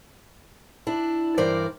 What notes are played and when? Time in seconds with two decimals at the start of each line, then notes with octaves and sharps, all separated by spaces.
0.87 D4 E4
1.38 G2 E3 A#4 C5 D5